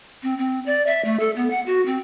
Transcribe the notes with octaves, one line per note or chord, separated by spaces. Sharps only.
C4
C4
D5
E5
A3
A4
B3
F#5
F#4
C4